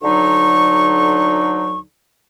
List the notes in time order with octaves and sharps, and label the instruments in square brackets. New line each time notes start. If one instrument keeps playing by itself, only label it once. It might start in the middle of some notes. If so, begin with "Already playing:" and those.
[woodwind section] D2 D3 F#3 D#4 C#6